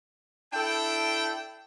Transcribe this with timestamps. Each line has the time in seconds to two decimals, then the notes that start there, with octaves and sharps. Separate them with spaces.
0.53 D4 E4 A4 G5